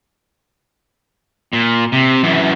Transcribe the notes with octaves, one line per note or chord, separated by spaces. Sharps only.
A#2
C3
F#2 E3